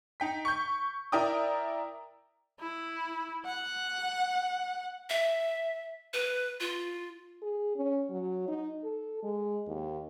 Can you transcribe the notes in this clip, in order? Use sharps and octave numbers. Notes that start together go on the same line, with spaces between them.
D#4 G5 B6
C#6 G6
E4 A#4 D5 G5 A#5 D#6
E4
F#5
E5
B4
F4
G#4
C#4
F#3
D#4
A4
G#3
D#2